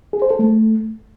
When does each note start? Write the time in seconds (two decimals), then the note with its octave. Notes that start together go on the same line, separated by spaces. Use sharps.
0.13 G#4
0.22 C5
0.31 A4
0.39 A3